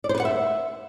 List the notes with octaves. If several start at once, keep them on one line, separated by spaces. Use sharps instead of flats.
D5
C5
B4
F#5
E5